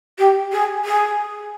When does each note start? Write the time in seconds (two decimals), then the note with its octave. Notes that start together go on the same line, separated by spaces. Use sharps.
0.18 G4
0.52 G#4
0.84 G#4